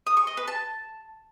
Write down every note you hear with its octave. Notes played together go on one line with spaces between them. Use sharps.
D#6
C#6
D#5
B4
A5